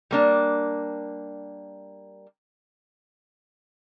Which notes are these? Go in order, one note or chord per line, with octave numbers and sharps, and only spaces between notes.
G3 A#3 D4